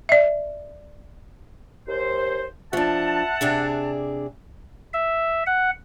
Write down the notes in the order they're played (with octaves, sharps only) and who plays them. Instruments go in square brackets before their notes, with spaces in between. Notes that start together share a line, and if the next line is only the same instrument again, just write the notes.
[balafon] D5 E5
[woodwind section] D#2 C5
[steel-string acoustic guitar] F3 D4 [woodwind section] E5 F#5 A5
[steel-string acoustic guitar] C3 D4 G#4
[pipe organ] E5
F#5